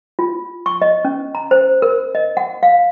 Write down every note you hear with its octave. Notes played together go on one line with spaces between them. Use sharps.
F4
C#6
D#5
C#4
A#5
C5
A#4
D#5
F#5
F5